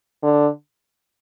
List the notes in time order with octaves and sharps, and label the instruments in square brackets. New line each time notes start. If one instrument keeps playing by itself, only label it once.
[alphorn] D3